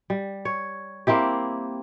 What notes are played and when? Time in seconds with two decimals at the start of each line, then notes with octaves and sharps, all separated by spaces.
0.10 G3
0.45 C#5
1.07 A#3 C4 E4 G4